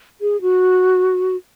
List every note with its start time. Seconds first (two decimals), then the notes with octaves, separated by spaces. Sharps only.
0.21 G#4
0.41 F#4